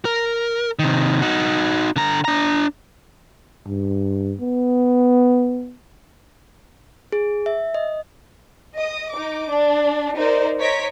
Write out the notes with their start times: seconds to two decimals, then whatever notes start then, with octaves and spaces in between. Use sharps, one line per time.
0.05 A#4
0.79 C3 D#3
1.22 D#4 F#4
1.96 D3 A#5
2.25 D4 A#5
3.66 G2
4.40 B3
7.12 G#4
7.46 E5
7.74 D#5
8.75 D#5 D#6
9.12 D#4 D6
9.49 D4
10.16 D#4 A#4 C5 D5
10.59 C5 C#5 D#5 A#5 B6 D7